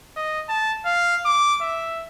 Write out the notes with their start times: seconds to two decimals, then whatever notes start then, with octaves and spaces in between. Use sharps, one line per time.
0.16 D#5
0.49 A5
0.86 F5
1.26 D6
1.62 E5